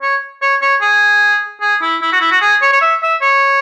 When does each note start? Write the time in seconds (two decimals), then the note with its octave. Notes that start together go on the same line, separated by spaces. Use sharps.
0.02 C#5
0.42 C#5
0.62 C#5
0.81 G#4
1.61 G#4
1.82 E4
2.02 E4
2.12 F#4
2.21 E4
2.31 F#4
2.41 G#4
2.61 C#5
2.73 C#5
2.81 E5
3.02 E5
3.22 C#5